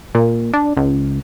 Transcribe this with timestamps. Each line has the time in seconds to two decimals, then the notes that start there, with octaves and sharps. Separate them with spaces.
0.15 A#2
0.53 D4
0.77 C#2